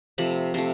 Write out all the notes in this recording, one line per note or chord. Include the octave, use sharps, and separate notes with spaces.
C3 F3 A3 B5
C3 F3 A3 C6